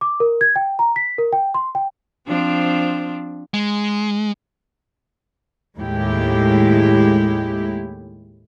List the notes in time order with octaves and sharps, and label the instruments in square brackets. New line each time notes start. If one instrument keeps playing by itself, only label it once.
[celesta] D6
A#4
G#6
G5
A#5
B6
A#4
G5
C6
G5
[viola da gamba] F3 C4 D4
[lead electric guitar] G#3
[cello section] D#2 A2 G#3 E4 G4